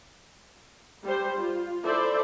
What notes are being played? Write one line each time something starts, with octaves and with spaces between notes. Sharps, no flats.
G3 G4 C5
F4
E4 A4 C5 D5 E5